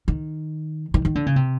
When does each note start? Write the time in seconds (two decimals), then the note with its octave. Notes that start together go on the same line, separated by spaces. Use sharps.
0.08 D#3
0.94 D#3
1.05 D#3
1.15 D3
1.26 C#3
1.36 C3